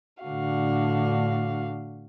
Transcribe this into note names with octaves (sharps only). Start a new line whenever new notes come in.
A2 D3 D4 F#4 F5